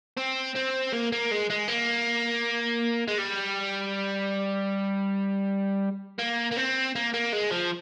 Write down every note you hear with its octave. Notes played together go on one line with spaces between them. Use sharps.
C4
C4
A#3
A#3
G#3
G#3
A#3
G#3
G3
A#3
A#3
C4
A#3
A#3
G#3
F3